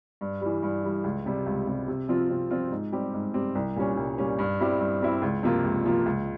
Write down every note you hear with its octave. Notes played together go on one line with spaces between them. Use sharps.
G2
E3 G3
G2
E3 G3
C#2
C3 G3
C#2
C3 G3
C3
F3 C4 F4
C3
F3 C4 F4
G#2
G3 C4 G4
G#2
G3 C4 G4
C2
A#2 G3 C#4
C2
A#2 G3 C#4
G2
G3 C4 E4 G4
G2
G3 C4 E4 G4
C#2
C3 F3 A#3 F4
C#2
C3 F3 A#3 F4
C#2